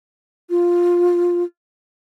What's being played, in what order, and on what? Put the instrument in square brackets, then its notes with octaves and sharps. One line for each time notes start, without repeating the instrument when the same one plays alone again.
[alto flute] F4